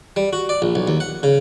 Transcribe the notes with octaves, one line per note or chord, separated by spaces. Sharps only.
G3
F#4
D5
A#1
B1
D#2
F#5
C#3